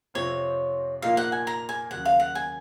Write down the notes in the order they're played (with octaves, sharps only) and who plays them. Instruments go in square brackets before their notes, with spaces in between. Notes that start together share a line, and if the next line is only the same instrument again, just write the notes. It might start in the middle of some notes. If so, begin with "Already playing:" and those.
[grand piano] F2 C3 F3 C4 F4 [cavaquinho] C#5
[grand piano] A#2 F3 A#3 D#4 [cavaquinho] F5
[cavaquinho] F#5
G#5
A#5
G#5
[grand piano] D#2 C#3 F#3 [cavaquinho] F#5
[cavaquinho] F5
F#5
G#5